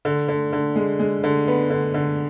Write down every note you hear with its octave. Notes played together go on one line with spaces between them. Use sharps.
D3
D3
D3
G#3
G#3
D3
B3
D3
D3